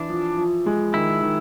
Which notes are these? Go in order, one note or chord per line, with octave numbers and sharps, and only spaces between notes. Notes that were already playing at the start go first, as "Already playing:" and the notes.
Already playing: E3 D4
F3
F3
G#3
D#3 E4
D#3